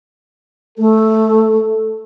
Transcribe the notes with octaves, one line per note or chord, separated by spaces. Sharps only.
A3 A4